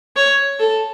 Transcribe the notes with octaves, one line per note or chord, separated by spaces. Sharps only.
C#5
A4